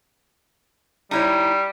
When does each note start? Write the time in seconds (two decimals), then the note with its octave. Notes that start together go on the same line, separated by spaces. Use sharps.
1.11 G3 D#4 E4 C#5